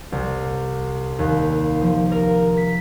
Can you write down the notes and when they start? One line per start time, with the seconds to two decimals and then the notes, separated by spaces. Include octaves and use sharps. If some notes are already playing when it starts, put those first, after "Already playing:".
0.12 C2
1.19 D#2
1.82 F3
2.12 A#4
2.57 B6